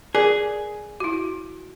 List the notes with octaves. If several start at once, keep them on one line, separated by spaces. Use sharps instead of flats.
G#4 A#4 D5 D6
E4 F#4